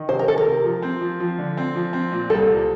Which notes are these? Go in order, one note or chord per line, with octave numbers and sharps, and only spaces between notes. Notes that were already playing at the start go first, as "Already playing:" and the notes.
Already playing: D#3
C3 C5
A#4
C3 A4
A#4
C3
F3
C4
F3
F3
D3
C4
F3
C4
A#2
C2 A4
C2